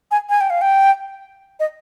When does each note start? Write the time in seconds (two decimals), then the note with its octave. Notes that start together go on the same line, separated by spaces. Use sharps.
0.11 G#5
0.30 G#5
0.41 G5
0.50 F5
0.61 G5
1.60 D#5